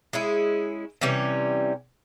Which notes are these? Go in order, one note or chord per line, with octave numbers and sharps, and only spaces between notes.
G#3 C#4 E4
C3 E3 G3 C#4